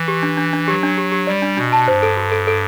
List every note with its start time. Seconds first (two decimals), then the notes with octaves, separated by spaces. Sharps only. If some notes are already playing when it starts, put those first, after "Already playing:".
Already playing: E3
0.08 G4
0.23 D4
0.37 D4
0.53 D4
0.68 F#3 G4
0.83 D4
0.98 G4
1.12 G4
1.27 G3 D5
1.42 D4
1.57 B2 D4
1.72 A5
1.87 G2 C5
2.03 A4
2.17 F#4
2.32 A4
2.47 A4